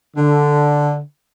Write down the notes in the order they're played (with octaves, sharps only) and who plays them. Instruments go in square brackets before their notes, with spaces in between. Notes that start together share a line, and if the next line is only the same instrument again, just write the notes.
[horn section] D3